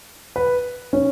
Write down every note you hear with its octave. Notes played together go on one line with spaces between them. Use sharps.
B4
C#4